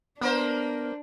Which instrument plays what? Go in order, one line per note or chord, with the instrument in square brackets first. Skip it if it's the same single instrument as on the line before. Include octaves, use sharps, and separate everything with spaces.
[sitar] A#3 A#4 C5 [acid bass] B3 [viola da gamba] D4